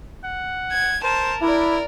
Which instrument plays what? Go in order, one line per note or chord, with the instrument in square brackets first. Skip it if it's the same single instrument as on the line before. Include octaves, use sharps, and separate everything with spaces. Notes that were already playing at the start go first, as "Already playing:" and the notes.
[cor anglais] F#5
[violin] G#6
[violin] A#4 A5 [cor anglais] C5
[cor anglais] D4 [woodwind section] E4 [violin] A#4 D5